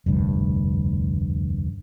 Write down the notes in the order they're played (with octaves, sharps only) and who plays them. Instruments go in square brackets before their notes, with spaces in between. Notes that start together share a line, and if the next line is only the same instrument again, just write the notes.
[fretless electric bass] F1 D2 G2